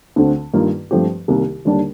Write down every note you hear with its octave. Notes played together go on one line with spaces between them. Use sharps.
D2 D3 A3 C4
G2 D#3 A#3 F4
G2 F3 A3 C4 G4
C2 C3 D#3 A#3
D#2 D3 G3 D4